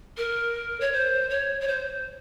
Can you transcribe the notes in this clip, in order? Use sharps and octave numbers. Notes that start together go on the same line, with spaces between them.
A#4
C#5
C5
C#5
C#5
C5